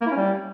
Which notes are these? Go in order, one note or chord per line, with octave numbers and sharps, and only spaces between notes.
A#3
E4
C#4
G3